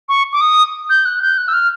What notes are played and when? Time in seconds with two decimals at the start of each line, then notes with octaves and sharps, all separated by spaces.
0.09 C#6
0.33 D6
0.41 D#6
0.90 G6
1.05 F#6
1.22 G6
1.38 F#6
1.48 E6
1.53 F6